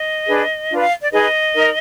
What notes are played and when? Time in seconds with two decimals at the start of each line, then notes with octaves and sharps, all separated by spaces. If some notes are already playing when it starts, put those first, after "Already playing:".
Already playing: D#5
0.28 D4 G#4 B4
0.70 D4 F4 B4
0.81 F5
1.01 D5
1.12 D#4 G#4 B4 D#5
1.55 D#4 A#4